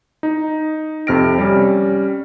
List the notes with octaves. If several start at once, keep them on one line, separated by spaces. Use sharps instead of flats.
D#4
F2 C3 F6 A#6 D7
G3 C#4